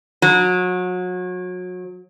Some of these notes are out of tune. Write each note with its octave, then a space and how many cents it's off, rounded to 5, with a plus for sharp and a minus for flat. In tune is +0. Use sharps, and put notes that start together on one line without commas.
F#3 -30